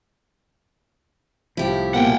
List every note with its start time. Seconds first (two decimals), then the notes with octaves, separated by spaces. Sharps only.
1.57 C2 A2 F3 E4 G4
1.94 B2 A#3 F#5 G5